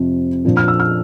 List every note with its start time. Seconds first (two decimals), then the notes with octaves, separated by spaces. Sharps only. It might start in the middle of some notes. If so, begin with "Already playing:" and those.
Already playing: F2 C3 F3
0.45 A#2 F3 A#3 D4
0.57 F6
0.68 E6
0.80 F6